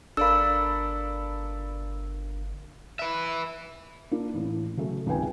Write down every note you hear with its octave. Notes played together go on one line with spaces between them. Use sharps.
G1 D4 A4 A#4 D5 F5 B5 E6
B4 E5
A#3 D4 F4
A1 A2
C#3 F#3 A3
G#1 C#2 G#2 B4 G5 G#5